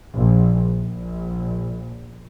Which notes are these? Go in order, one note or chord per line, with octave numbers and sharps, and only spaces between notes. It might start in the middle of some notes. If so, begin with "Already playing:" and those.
A#1
A#1